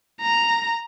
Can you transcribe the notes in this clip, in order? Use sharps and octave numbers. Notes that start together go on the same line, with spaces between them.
A#5